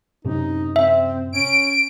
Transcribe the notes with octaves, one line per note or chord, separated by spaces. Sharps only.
F#2 A2 C3 D#4
C4 E5
C#4 D7